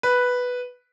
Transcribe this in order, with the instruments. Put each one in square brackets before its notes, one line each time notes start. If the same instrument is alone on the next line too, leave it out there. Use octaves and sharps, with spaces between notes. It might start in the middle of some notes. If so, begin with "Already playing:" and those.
[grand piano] B4